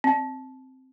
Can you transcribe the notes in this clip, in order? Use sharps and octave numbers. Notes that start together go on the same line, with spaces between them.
C4